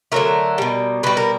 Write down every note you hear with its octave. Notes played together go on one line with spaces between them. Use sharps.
D3 F#3 A3 A#4
B2 G3
B2 G3 B4
A#4